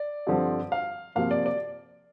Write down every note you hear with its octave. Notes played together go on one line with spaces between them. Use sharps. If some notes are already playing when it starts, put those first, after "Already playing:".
Already playing: D5
G2 D3 F3 C4
F5
C3 F3 A#3 F5
D5
D5